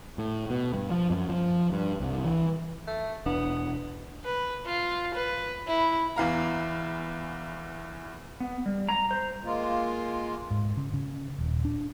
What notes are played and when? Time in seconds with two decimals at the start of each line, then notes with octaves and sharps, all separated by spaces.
0.18 A2
0.50 B2
0.74 G2
0.91 F3
1.10 F#2
1.30 F3
1.72 G2
2.00 C2
2.24 E3
2.87 A3
3.26 E1 B3 D4
4.24 B4
4.66 F4
5.14 B4
5.67 E4
6.16 E2 E3 F5 A#5
8.40 B3
8.66 G3
8.89 A#5
9.11 C5
9.44 G#3 A#3 F4
10.51 G#2
10.77 C#3
10.94 C#3
11.39 D#1
11.65 D4